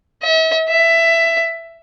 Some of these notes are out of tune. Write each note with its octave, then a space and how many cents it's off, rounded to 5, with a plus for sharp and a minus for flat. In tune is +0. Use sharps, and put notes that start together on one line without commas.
E5 -40
E5 +15